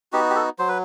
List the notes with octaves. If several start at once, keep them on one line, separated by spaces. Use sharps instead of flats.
B3 D#4 F#4 G4
G4
A4
F#3 C5
B4